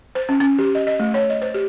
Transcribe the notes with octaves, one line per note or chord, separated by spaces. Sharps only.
C5
C#4
C#4
G4
D#5
D#5
A3
C#5
D#5
C5
G4